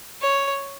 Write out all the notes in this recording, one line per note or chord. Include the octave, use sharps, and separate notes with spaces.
C#5